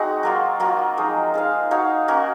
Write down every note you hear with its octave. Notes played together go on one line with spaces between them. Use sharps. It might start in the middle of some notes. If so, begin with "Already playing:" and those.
Already playing: G#3 C4 D#4 F#4
F#3 A#3 F4
F#3 A#3 F4
F3 G#3 D#4 A#4
D#4 G#4 C5 F5
D#4 F#4 C#5 F5
A#3 C#4 F#4